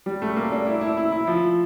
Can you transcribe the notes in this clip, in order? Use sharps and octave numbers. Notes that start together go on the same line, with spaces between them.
G3
A3
A#3
D4
E4
E4
E4
E4
F3